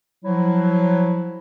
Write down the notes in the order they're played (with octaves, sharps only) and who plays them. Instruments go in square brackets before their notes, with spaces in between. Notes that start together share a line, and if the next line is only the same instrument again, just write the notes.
[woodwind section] F3 F#3 E4